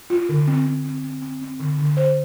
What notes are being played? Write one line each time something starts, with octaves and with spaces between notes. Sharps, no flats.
F4
D3
C4
C4
C4
C4
C4
C4
D3
D3
C5